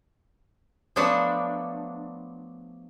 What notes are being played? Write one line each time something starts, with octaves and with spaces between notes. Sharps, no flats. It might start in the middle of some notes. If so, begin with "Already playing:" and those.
F3 F#3 A3 B3 D4